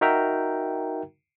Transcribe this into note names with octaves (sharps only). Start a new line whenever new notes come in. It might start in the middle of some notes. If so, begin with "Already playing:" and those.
D#4 F#4 A#4 E5 G5 A#5